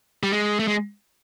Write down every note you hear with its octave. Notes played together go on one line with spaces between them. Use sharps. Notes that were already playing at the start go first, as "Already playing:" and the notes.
G3
G#3
A3
G#3